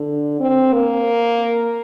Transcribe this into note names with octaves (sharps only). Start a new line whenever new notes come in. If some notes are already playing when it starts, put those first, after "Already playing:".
Already playing: D3
C4
A#3